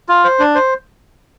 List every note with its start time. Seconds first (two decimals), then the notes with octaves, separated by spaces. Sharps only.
0.09 F4
0.24 C5
0.40 D4
0.55 C5